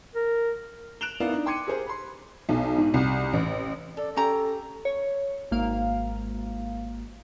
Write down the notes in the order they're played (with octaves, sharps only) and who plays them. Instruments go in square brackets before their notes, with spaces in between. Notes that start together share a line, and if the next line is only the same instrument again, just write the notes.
[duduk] A#4
[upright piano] F#6 D7 E7 F7 G7
B3 D#4 E4 A#4 D5 F5
D4 D#4
G5 C6 D6 G#6 C#7 D#7
G4 G#4 A#4 C5
B5 C6
[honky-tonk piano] B1
G#2
C2
A1
[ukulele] A4 [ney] D5
[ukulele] C#4 G4 A#5 [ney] A4
[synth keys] C#5
G#1 A#3 F5